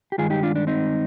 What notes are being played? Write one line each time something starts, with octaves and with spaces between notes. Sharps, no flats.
G4
G2 D#3 G#3 F4 G#4
D#4 G4
D4 F4
D4
C4 D#4